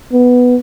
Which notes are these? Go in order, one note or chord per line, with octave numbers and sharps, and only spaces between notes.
B3